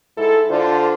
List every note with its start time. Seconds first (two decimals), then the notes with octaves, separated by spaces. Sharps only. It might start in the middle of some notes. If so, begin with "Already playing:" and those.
0.17 G#2 E4 A4
0.50 D3 D4 F4 C5